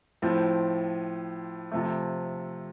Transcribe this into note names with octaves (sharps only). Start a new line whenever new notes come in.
A2 F3 C4
C3 F3 A3